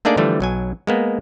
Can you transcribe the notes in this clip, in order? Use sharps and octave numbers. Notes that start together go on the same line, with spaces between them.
A3 A#3 D4 D#4 G#4 D5
D3 E3 F3 G3 A3
B1 F#3 G#5
G#3 A#3 B3